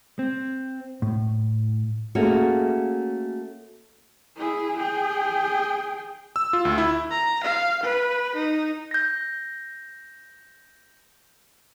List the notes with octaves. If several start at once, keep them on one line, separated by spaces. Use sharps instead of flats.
C4
A2
A3 A#3 C#4 F#4 G#4
E4 G#4
G#4 G5
E6
F4
D2
E4
A#5
F5
B4
D#4
G6 A#6